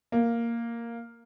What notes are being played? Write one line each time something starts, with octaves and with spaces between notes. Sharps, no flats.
A#3